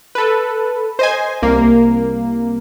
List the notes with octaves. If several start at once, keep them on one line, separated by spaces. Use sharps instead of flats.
A4 B4
C5 D#5 G#5
C2 A#3